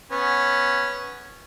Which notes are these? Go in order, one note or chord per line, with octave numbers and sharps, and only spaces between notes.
B3 C#4